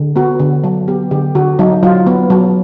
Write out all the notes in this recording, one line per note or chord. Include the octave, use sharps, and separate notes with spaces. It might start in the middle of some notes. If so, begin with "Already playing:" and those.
Already playing: D3
B3 F#4
D3
F#3
B3 G4
D3 G4
D3 F#4
F#3 D#4
F#3 F4
B3
F#3